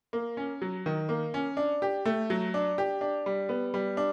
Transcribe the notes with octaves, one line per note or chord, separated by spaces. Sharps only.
A#3
C#4
F#3
D#3
A#3
C#4
D4
G4
A3
F#3
D4
G4
D4
G3
B3
G3
D4